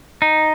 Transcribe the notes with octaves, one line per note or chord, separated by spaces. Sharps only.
D#4